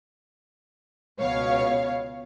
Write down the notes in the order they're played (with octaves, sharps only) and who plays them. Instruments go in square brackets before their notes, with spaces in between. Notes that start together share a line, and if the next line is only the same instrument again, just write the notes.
[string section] C#2 B2 C#5 F5